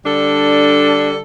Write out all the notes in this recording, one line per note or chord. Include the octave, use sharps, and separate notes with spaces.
D3 G3 D4 A4